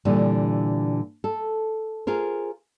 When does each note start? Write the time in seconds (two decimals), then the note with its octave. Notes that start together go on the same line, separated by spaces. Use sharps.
0.05 A#2 D3 E3 G3
1.24 A4
2.07 F4 G#4 A#4 C5